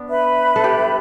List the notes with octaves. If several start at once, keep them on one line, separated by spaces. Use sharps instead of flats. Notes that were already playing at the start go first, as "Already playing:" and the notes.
Already playing: B3 D4
B4 E5 B5
A4
G4